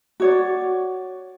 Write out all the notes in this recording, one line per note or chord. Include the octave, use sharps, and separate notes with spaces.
F#4 C#5 D5